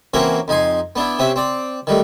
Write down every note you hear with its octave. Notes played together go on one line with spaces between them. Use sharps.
E3 A#3 C4 C#4 F#4 A#4
F2 D#4 G#5 C6
B3 D4 E4
C3 C4 C#4 E5
C4 D5
D#3 G3 A3